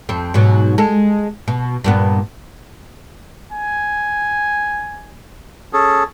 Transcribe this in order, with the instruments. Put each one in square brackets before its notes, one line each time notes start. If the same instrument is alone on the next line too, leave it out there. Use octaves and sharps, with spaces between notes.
[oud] F2 C4
G#2 B2 F#3
G#3 A4
B2
G2 A#2 B3
[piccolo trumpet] G#5
[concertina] C#4 G#4 A4